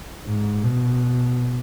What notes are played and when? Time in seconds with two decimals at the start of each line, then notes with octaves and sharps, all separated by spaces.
0.26 G#2
0.64 B2